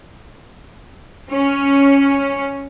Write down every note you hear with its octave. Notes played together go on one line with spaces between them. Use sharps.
C#4